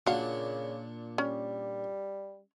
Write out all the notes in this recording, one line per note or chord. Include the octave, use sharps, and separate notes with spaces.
A#2 C#3 D4 F#4 F5
G3 C#4